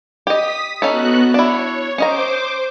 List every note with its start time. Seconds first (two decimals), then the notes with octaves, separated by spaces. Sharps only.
0.27 G4 D#5 D#6 B6
0.82 B3 C#4 D#4 F#4 A4 F#6
1.34 D4 E4 C#5
1.98 C#4 C5 D#5 A#5 D6